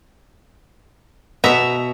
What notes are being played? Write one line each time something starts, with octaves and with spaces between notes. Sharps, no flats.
B2 B3 E5 A#5